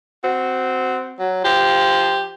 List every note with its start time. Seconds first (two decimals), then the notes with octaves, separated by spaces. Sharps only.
0.24 C4 F#4
1.19 F#3
1.44 F3 G4